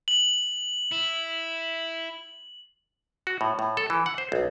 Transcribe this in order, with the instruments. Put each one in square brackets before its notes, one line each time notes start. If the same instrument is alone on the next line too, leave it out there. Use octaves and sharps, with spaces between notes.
[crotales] F#7
[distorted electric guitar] E4
[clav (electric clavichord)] F#4
A2
A2
A4
E3
F#5
C5
B1